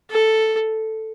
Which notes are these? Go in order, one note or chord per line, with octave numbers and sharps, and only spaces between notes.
A4